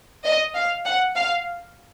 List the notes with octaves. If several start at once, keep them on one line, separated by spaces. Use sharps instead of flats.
D#5
F5
F#5
F5